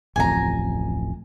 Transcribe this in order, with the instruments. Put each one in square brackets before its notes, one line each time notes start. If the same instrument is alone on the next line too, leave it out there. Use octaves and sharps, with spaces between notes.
[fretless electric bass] D1 A1 F2 [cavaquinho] G#5 A#5